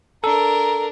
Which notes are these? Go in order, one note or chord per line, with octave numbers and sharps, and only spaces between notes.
D4 A4 A#4 A#5